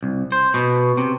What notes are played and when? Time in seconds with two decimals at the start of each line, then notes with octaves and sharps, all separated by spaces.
0.03 C2
0.32 C5
0.54 B2
0.97 C3